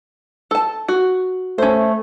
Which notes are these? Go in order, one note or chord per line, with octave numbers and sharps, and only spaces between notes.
A4 A5
F#4
A3 C#4 C5